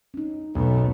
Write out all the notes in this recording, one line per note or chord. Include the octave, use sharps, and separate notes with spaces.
C#4 D#4
B1 E2 B2 A3 B3 D#4 F#4